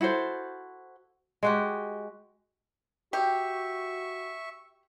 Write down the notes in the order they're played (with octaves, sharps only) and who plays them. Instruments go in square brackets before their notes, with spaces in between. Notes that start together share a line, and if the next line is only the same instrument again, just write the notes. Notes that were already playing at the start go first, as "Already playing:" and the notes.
[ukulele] E4 F#4 A4 C5
[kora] G#3 F#4 G4
[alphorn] F#4 [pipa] G4 [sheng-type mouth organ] E5 C#6